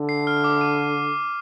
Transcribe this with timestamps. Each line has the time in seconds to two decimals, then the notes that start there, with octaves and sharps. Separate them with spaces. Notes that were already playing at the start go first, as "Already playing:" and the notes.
Already playing: D3
0.09 C7
0.27 F6
0.44 D6
0.61 D#7